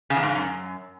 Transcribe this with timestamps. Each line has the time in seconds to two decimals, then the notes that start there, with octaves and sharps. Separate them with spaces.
0.10 C#3
0.16 E2
0.23 G#2
0.29 G2
0.35 F#2